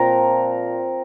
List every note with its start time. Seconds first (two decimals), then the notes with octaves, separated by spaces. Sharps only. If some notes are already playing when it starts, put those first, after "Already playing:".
Already playing: A#2 F3 C4 F4 A#4 A#5